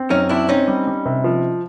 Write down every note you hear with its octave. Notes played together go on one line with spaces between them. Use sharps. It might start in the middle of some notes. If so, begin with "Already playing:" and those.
Already playing: C4
F#2 C#4 D#4
C4 D4 E4
C4 C#4 D#4
G3
G3
C3
F3